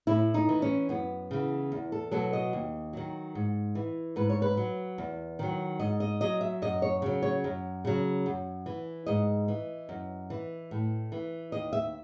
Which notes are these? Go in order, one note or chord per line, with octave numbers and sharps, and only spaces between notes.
A2 E4
D#4
E3
C#4
F#2 B3
C#3 E3
E2
A4
B2 F#3 A4
D#5
D#2
D#3 F#3
G#2
E3
G#2 B4
C#5
B4
F#3
E2
D#3 F#3
G#2 D#5
D#5
F#3 D#5
E5
F#2 D#5
C#5
C#3 F#3
C#5
F#2
C#3 F#3
F#2
E3
G#2 D#5
E3
F#2
E3
A2
E3
D#2 D#5
E5